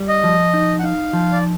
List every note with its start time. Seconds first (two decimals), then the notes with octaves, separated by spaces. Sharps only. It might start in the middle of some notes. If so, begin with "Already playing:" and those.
Already playing: G3
0.08 D#5
0.24 F3
0.54 D#4
0.79 F#5
0.84 D#4 F5
1.13 F3
1.32 D5